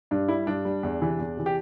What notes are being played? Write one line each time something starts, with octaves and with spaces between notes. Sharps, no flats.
G2 D4
G3 E4
G2 D4
G3
E2
C3 E3
E2
C3 E3
G4